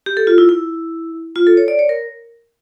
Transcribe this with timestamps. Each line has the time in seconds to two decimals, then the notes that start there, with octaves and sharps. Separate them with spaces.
0.06 G4
0.17 A4
0.27 F4
0.38 E4
0.49 E4
1.36 F4
1.47 A4
1.57 C#5
1.68 D5
1.79 C#5
1.89 A#4